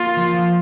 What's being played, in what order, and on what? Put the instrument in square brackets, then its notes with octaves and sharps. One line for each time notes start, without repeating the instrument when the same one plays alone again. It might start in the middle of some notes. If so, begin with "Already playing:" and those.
Already playing: [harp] A#3 [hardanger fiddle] F4
[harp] F3